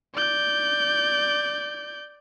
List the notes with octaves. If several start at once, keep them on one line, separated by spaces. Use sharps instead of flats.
D5 G6